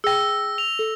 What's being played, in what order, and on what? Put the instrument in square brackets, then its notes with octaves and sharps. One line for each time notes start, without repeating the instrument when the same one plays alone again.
[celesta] G#4 G5 [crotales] E6 A#6
[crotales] F7
[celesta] A4